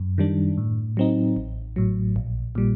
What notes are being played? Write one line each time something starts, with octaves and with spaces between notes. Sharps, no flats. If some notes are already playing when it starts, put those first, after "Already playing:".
Already playing: F#2
D#3 G3 D4
A2
F#3 C4 D#4
A1
A2 F#3
A#1
A#2 G3